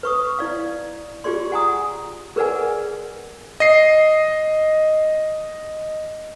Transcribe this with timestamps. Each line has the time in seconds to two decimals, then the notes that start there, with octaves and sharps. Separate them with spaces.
0.03 B4 C#6 D#6
0.39 E4 D5 F5
1.24 F4 G4 G#4 D5 C6
1.52 F#5 G#5 A#5 D#6
2.36 G#4 A#4 B4 D5 F#5 G#5
3.60 D#5 C7